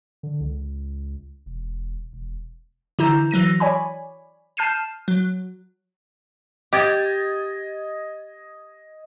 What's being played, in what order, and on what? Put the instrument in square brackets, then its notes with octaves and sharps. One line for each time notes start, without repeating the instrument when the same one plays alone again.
[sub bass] D3
C#2
E1
E1
[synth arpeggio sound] D3 E3 E4 A#5 G6
E3 F#3 A#6 D#7
C#5 D5 G#5 B5
A5 F6 G6 C7 D#7 E7
F#3
[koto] G4 [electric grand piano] D#5 G#6 A6